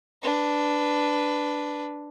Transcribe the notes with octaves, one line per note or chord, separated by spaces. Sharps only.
D4 B4